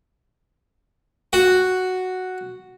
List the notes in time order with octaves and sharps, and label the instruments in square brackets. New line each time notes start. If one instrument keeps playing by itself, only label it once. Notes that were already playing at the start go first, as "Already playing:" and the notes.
[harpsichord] F#4